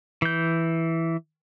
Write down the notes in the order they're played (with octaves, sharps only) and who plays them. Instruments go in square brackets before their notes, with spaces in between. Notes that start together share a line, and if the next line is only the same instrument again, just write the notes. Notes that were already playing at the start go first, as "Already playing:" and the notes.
[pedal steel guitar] E3 G6